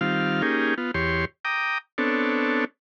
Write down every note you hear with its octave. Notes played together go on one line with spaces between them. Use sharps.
D#3 G3 C4 F4 F5
A#3 C#4 D#4 G4 G#4
B3 F4
E2 G4 C#5 C6
G5 A#5 D6 D#6
B3 C4 D4 A4 C#5